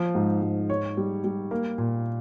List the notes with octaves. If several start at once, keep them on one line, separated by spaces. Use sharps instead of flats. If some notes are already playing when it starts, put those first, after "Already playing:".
Already playing: F3
G#2
G#2
C#5
G3
G3
A#3
A#2